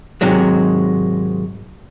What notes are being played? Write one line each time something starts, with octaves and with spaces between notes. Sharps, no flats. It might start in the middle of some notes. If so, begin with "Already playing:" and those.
G#2 C3 D#3 F#3 G#3